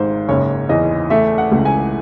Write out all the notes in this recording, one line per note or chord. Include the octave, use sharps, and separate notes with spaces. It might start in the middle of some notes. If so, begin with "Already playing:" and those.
Already playing: G#1 G#2 C5
F#1 C#5
E2 D#5
A3 E5
F#5
C#2
G#5